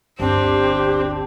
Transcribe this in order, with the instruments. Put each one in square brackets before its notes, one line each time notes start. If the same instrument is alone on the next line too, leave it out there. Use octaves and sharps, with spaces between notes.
[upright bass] G1 D2 [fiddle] C4 [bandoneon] D4 [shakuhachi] G4